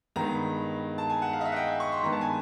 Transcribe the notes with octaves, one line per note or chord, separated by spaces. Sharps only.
G2 D#3 G#3 B3 A#5
A5
G#5
F#5
F5
D#5
E5
F#5
G5
G#5
C#6
C6
G2 D#3 G#3 B3 A#5
A5
G#5